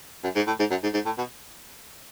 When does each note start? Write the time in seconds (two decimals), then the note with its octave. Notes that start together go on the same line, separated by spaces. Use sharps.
0.24 F#2
0.36 G#2
0.47 A2
0.59 G#2
0.71 F#2
0.83 G#2
0.94 G#2
1.05 A2
1.18 B2